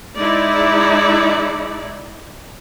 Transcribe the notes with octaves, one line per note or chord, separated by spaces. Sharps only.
G#3 D#4 E4 D5